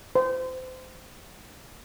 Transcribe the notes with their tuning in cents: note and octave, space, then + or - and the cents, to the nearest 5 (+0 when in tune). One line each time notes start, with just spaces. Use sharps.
C5 -25